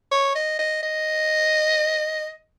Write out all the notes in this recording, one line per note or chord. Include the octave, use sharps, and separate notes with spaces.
C#5
D#5
D#5
D#5